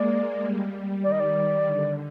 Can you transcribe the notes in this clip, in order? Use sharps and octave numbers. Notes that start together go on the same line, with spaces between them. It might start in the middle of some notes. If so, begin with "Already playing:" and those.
Already playing: G#3 A#3 D5
G3
D#3 D5
D#5
D5
D3